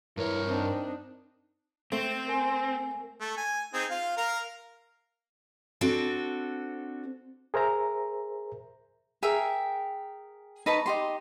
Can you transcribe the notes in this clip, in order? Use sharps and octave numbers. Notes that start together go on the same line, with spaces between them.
G2 E3 A#4 C#5 A#5
C4 D4 D#4
A3 C4
A#4 G#5
A3
G#5
C4 D#4 G#4
F4 F5
A#4 F5 A#5
C4 D4 F#4 A4
G#4 A#4 C5 E5 A#5
G#4 A#4 E5 G5
D#4 B4 A5 C#6
D#4 G4 C6